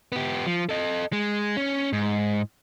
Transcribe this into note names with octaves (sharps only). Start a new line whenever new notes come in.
B3 G4
F3
A4 D#5
G#3
C#4
G#2